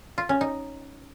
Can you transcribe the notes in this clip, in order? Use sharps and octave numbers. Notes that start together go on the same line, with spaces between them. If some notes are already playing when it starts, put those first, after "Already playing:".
F4
C#4
D#4